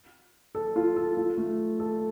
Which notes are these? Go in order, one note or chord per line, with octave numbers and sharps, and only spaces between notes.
A4
F4
A4
F4
A3
A4